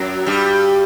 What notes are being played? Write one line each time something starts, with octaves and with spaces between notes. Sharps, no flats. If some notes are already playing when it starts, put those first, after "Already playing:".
Already playing: F#2 F#3
G2 G3